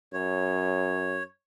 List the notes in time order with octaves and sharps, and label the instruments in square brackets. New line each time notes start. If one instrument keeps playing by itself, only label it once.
[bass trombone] F#2 [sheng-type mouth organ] C#5